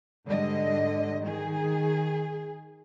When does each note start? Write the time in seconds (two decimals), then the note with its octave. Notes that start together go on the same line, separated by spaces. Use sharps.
0.26 G#2 D3 G3 D#5
1.22 D#3 G#4